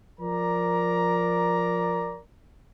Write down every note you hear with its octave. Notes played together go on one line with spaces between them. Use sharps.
F3 A#4 D5 A#5